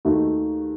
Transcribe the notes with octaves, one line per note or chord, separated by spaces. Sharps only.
D#2 D#3 A3 D#4 F#4